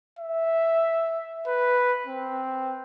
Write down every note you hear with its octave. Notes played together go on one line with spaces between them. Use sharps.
E5
B4
C4